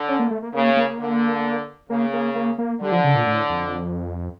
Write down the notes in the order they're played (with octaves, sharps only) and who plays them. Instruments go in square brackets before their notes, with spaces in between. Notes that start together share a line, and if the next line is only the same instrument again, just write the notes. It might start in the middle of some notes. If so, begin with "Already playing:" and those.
Already playing: [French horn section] D3
[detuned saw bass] C#4
A#3
A3
A#3
[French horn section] C#3 [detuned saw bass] A#3
[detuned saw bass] A#3
[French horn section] D3
[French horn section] C#3 [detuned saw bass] A#3
[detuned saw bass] A#3
A#3
A#3
[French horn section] D3 [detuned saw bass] G3
[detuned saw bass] F3
C#3
A#2
A2
F2